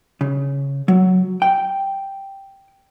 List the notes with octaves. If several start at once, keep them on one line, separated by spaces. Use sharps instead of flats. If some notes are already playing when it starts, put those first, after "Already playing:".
C#3
F#3
G5